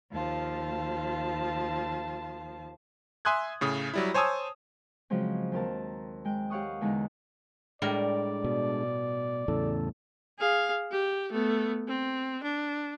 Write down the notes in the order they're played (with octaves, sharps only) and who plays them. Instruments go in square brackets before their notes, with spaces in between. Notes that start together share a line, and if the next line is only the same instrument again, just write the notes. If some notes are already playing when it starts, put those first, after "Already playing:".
[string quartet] D#2 F3 F4 A5
[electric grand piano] E5 G#5 C6 D#6 F#6 G#6
A2 C#3 D#6
F#3 G3 E4
C5 C#5 G#5 A5 D#6 E6
[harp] C#3 F3 F#3 G#3 C4
D#2 C4 A#4 A5
G#3 G5
G4 C#5 F5 F#5 C#6 D#6
E2 D3 G#3 D#4
[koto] A2 G3 A#4 [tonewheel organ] G#3 D4 [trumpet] D5
[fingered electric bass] B2
[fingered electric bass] E2 A2 [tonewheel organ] C#3 A4
[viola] G#4 F5
G4
A3 B3
C4
D4